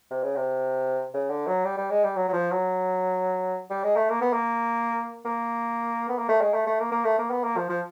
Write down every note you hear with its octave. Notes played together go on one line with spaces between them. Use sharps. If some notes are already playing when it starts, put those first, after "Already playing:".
C3
C#3
C3
C#3
D3
F#3
G3
G3
G#3
G3
F#3
F#3
F3
F#3
G3
G#3
A3
A#3
B3
A#3
A#3
B3
A#3
A3
G#3
A3
A3
A#3
A#3
A3
A#3
B3
A#3
F3
F3